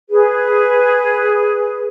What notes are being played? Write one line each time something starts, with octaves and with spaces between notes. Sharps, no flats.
G#4 B4